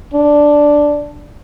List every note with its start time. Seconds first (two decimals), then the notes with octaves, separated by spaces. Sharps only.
0.13 D4